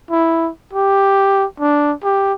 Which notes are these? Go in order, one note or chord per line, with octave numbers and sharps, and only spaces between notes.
E4
G4
D4
G4